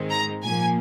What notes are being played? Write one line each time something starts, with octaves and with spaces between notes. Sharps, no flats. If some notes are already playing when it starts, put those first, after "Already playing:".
Already playing: G#2 D#3 G#3 C4
A#5
A#2 F3 A#3 G#5